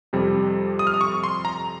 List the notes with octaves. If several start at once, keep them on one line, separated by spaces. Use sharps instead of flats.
F2 C3 G3
D#6
F6
D#6
C#6
C6
A#5